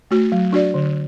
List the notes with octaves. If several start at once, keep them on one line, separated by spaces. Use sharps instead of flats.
A3 F#4
F#3
D4 F#4 D5
D3